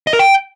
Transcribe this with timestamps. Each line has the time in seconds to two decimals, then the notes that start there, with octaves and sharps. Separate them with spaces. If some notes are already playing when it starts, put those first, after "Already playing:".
0.07 D#5
0.13 A#4
0.19 G5